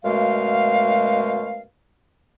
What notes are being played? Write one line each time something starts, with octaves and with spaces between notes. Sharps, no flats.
F#2 B2 G#3 A3 F5